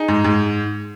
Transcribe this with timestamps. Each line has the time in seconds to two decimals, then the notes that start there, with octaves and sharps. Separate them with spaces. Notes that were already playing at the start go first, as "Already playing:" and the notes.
Already playing: D#4 G#4
0.08 G#2
0.24 G#2